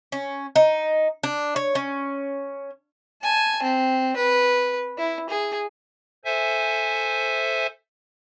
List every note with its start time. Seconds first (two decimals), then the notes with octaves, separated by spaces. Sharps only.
0.12 C#4
0.56 D#4
1.23 D4
1.56 C#5
1.75 C#4
3.23 G#5 A5
3.63 C4
4.16 B4
4.98 E4
5.30 G#4
6.25 A4 C5 E5 G#5